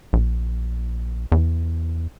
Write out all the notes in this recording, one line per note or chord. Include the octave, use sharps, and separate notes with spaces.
A#1
E2